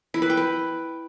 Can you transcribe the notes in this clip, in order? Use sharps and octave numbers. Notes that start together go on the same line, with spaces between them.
E4
B4
G5
B4